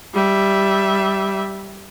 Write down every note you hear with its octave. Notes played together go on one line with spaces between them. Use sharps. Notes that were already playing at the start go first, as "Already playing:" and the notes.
G3 E5